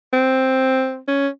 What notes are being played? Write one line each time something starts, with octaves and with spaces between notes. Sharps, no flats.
C4
C#4